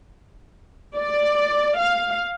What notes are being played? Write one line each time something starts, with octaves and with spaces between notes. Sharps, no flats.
D5
F5